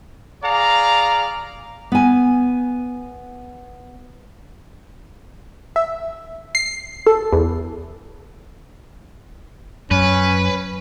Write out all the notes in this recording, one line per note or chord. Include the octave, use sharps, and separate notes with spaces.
G#4 D5 F5 A#5
B3 G#5
E5
C7
A4
E2
F#2 C#4 B4